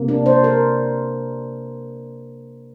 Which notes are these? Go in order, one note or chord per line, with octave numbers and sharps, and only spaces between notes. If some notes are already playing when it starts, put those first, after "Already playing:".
Already playing: C3 A#3
D4
C5
A#4